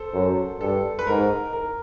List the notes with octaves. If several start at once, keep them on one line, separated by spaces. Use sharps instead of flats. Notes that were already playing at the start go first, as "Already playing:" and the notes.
Already playing: A4 C5
F#2
G2 A4
B4
G#2 A#4
A#4